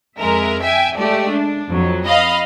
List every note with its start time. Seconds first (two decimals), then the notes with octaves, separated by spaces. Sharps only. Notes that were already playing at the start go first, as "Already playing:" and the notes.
0.17 F2 G#3 A#4 E5
0.62 E5 G5 G#5
0.95 G#3 A3 G4 D5
1.30 D4
1.70 F2 F#3
2.06 D#5 F5 B5